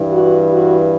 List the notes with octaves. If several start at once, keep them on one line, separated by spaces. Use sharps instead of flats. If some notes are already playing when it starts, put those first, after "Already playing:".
Already playing: G2 E3
F#4
F#4